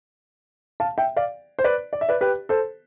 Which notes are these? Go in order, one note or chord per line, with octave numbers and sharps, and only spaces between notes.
F5 A5
E5 G5
D5 F5
C5
B4 D5
D5
E5
B4 D5
G4 B4
A4 C5